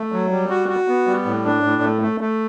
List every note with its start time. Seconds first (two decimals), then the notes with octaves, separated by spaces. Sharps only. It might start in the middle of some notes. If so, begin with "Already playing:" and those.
Already playing: A3
0.12 F#3
0.31 G3
0.50 F#4
0.69 F#4
0.88 B3
1.07 G3
1.26 A2
1.45 D4
1.63 A2
1.82 A3
2.02 A3
2.21 A3